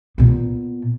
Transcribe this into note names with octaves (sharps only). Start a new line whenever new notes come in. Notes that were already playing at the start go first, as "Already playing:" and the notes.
A#2 B3